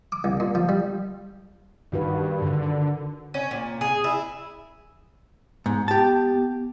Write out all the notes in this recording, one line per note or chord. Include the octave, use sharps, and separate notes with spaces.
D6
C2
A#2
F3
G3
G2 D#3 F#4 B4
D3
C#4
A#2
G#4
E4
G#2 B3
G4 A5